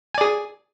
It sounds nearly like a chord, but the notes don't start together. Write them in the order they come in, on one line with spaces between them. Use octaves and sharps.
G#5 D5 G#4